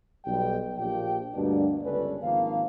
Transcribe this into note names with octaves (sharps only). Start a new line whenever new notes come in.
B1 G3 G5
A#1 A#2 F3 G4 G5
D2 G2 B2 A#3 D4
G1 C#2 C#4 A4 B4 D5
G#1 D#3 F3 A#3 F5